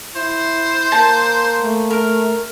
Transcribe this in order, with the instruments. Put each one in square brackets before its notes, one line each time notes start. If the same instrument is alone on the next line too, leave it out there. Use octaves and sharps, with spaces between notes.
[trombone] E4 [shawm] C5
[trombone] A#3 [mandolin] A5
[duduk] A3
[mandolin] A#4